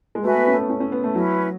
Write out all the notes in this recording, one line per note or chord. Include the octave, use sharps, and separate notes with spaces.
G#3
A3 F#4 B4 E5 G#5
B3
C#4
A3
B3
C#4
C#4
B3
A3
F#3 C#4 E4 B4